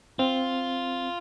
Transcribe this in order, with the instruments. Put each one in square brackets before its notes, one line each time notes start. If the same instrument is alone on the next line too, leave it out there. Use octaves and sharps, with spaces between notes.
[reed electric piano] C4 [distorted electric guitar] F4